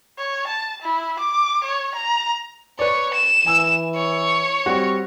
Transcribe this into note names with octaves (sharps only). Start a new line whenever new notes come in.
C#5
A5
E4
D6
C#5
A#5
B4 C#5 D5
E7
E3 G#5 E6
C#5
G3 C4 F#4